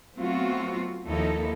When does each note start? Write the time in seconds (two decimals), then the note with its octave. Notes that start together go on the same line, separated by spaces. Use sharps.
0.17 F#3 A3 B3 C4 F4 F#4
1.07 D#2 F3 A#3 D#4 E4 A4